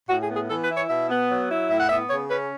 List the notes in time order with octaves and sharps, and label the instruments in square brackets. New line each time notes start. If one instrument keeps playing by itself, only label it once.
[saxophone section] A2 F#4
G#4
B3
G#4
E3 A4
B4
E4
C#5
B2 E5
B3
F#3
E4
A2 E5
F#5
B3 E5
C#3 C#5
C#4 B4